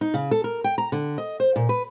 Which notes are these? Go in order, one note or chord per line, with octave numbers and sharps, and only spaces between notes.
D#4
C#3
A4
A#4
G5
A#5
D3
D#5
C5
A#2
B4